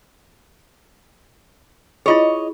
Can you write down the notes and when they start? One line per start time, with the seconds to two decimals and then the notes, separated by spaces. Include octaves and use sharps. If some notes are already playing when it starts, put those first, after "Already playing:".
2.06 E4 F4 G#4 C#5 D#5